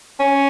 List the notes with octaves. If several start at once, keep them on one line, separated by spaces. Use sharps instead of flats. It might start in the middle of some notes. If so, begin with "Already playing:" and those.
C#4